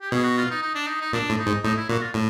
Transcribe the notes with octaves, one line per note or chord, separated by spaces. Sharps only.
G4
B2 G#4
F#4
F4
D#4
D#4
D4
D#4
D#4
A#2 D4
A2
D#4
G#2
A2 D#4
E4
A#2 F#4
F4
A2